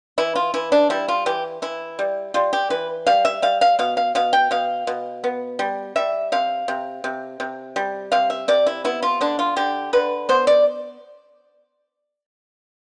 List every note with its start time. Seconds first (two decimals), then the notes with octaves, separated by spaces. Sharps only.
0.18 E3 E4
0.36 F4
0.54 E3 E4
0.72 D4
0.90 G3 E4
1.08 F4
1.26 E3 G4
1.62 E3 E4
1.99 G3
2.34 G3 F4
2.53 G4
2.70 E3 B4
3.07 G3 F5
3.25 E5
3.42 G3 F5
3.61 F5
3.79 B2 F5
3.97 F5
4.15 B2 F5
4.33 G5
4.51 B2 F5
4.87 B2
5.24 B3
5.59 G3
5.96 G3 E5
6.32 C3 F5
6.68 C3
7.04 C3
7.40 C3
7.76 G3
8.12 C3 F5
8.30 E5
8.48 C3 D5
8.66 E4
8.84 B3 E4
9.03 F4
9.21 D3 D4
9.39 F4
9.56 D3 G4
9.93 D3 B4
10.29 B3 C5
10.47 D5